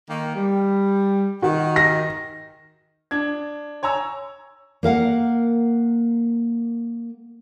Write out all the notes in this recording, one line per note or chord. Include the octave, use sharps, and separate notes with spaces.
D#3 A#3
G3
D#3 F#4
A#6
D4 G#6
C#5 G#5 A#5 E6
A#3 A#4 F5 F#5